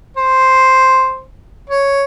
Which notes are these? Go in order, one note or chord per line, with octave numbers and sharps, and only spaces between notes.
C5
C#5